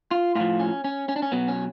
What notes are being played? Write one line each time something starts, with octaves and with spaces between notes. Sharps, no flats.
F4
A2 F3 F4
C#4
C#4
C#4
D4
C#4
B2 F#3 B3
C#4